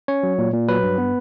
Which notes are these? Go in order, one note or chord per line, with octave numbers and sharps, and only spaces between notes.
C#4 C#5
F#3
A#2
A#2
F#3 B4
G2
B3